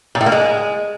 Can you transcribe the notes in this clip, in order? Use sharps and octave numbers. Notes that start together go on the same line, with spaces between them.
A#2
A2
A#3
G#3